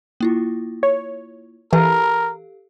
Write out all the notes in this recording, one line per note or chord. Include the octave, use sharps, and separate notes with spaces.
A#3 E4 F4
C#5
E3 G4 A4 A#4 F5